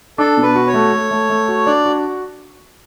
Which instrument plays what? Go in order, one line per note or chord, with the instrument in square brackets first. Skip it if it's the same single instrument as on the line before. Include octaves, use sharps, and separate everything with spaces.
[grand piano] D4 [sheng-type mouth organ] A4
[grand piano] B2
[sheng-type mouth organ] B4
[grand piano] F#4
[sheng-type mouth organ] C#5
[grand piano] A3
A3
A3
A3
F#4
[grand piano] D4 [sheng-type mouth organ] D5
[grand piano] F#4